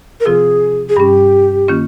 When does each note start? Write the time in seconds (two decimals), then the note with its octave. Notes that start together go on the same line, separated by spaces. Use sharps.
0.20 A#4
0.26 C3 F3 C4 F4 G#4
0.89 G#4
0.97 G2 G3 C#4 G4
1.68 D#3 A#3 C#4 F4